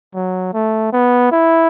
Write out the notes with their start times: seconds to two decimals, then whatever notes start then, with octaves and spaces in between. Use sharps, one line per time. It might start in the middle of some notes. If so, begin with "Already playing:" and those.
0.14 F#3
0.53 A3
0.93 B3
1.32 E4